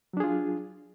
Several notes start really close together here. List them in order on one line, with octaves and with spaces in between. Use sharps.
F#3 D4 G#4 F4